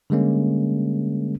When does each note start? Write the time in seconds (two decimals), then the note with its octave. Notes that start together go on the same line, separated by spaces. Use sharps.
0.10 D3 G3 G#3 A#3 C#4